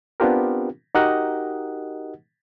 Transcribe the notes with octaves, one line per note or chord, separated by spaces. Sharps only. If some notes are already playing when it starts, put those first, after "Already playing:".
B3 C4 D4 F4 G4 A#4
D#4 F#4 G4 A#4 D#5 F#5